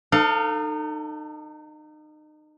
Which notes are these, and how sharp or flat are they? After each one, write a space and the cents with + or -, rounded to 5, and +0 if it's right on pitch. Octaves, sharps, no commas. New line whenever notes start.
D#4 -30 A4 +25 F5 +10